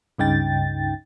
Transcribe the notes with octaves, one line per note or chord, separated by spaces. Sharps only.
C#2 G2 C#3 D#4 G5 A6